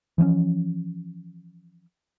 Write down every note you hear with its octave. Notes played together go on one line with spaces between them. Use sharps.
E3 F3 C4 C#4